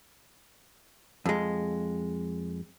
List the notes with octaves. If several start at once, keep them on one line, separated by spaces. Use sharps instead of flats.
F2 G#3